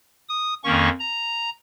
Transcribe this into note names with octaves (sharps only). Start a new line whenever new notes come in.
D#6
F2 D#3 A#3 C#4 C#6
A#5